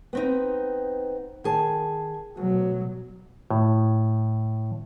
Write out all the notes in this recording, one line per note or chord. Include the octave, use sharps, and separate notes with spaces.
B3 C4 D#4
D#3 G#4 A5
D2 B2 F#3
A2